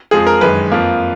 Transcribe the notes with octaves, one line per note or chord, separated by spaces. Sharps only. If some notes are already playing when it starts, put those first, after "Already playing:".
F2 F3 G#3 G#4
A#4
F#2 D#3 G#3 B4
F2 F3 A#3